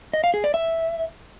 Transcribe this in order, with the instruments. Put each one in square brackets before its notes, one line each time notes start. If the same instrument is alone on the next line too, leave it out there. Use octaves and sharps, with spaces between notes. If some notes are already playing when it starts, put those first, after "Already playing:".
[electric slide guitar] D#5
F5
G#4
D5
E5